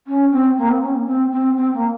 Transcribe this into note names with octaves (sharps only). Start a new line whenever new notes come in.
C#4
C4
A#3
C4
C#4
A#3
C4
C4
C4
A#3